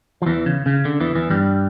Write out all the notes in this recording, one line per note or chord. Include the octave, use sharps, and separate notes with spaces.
F3
E2 E3
C#3
C#3
D3
E2 E3
E2 E3
G2 G3